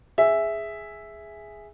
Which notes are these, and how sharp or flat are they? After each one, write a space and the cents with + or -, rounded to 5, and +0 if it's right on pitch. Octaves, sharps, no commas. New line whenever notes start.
G#4 +0 E5 +0